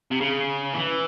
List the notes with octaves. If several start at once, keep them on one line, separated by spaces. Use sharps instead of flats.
C3
C#3
E3